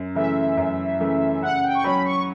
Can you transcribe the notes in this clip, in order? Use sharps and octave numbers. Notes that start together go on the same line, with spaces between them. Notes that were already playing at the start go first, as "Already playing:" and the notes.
Already playing: F#2
C#3 E3 A3 E5
F#2
C#3 E3 A3
C#3 F#5
G5
C#6
F#3 C#4 B5
C#6